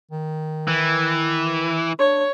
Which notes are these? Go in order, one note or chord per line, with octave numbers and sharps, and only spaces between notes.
D#3
E3
D4 C#5